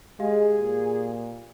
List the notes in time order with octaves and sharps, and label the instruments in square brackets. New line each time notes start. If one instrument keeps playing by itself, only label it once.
[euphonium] G#3 [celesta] G4 F5 [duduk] G#4
[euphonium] A#2